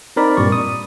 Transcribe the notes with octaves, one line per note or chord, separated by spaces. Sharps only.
C4 D#4 A#4 D5 B5
G2 A#2 G3 D5 C#6
D#6